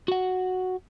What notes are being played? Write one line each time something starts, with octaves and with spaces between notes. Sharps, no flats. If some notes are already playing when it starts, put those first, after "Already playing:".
F#4 F#5